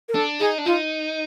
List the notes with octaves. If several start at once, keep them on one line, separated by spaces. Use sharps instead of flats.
A#4
D4 A4
D#4 G#4
D4
D#4 F4